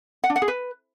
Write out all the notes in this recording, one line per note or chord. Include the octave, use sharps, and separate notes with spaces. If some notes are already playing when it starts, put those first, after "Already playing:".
F#5
D4
F#5
G#4
B4